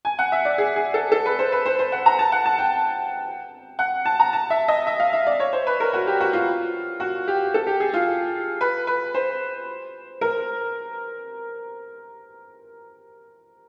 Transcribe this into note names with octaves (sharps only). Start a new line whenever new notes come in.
G#5
F#5
E5
D5
G#4
G#4
A4
A4
B4
C5
B4
C5
C5
F#5
A#5
A5
F#5
A5
G5
F#5
A5
A#5
A5
E5
D#5
E5
F5
E5
D5
C#5
C5
B4
A#4
F#4
G4
F#4
F4
F#4
G4
A4
G4
G#4
F4
B4
B4
C5
A#4